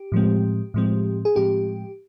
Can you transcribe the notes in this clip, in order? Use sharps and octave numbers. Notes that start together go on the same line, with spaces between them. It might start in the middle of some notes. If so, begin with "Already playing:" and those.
Already playing: G4
A2 F3 G#3 C4
A2 F3 G#3 C4
G#4
A2 F3 G#3 C4 G4